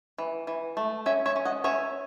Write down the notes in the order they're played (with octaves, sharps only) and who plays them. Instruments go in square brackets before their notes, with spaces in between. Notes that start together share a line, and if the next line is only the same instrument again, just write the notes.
[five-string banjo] E3
E3
A3
C#4 C#5 E5
C#5 E5
C#4
D#5 F#5
C#4 C#5 E5